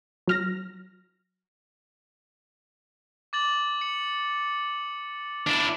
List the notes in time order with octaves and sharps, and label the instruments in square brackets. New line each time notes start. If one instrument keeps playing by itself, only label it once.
[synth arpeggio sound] F#3 F6 A#6
[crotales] D6 A6 F#7
C#7
[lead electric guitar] D4 E4